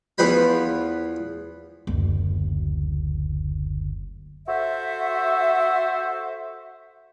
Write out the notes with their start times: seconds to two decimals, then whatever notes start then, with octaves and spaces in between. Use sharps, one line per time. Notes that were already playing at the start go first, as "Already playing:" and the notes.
0.18 E2 F3 B4 C5 B5
1.87 F#1 D2
4.48 F#4 A4 C5 E5